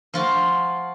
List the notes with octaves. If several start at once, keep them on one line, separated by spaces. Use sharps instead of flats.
F3 F4 F#4